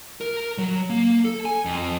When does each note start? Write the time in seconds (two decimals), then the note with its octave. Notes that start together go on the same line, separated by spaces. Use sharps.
0.21 A#4
0.58 F#3
0.90 A#3
1.25 A4
1.45 G#5
1.65 F2